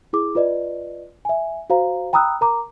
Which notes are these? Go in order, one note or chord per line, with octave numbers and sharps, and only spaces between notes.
E4 G#4 D6
F4 B4 D5 D#5
E5 G#5
F#4 C5 F5 A#5
G5 A#5 B5 D#6 E6 F#6
A#4 A#5 D6